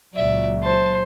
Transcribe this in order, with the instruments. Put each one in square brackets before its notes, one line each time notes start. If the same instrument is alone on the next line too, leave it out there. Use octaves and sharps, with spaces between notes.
[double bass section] C#2 A#2 F#3 [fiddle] D5 E5
[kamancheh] C5 [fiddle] A5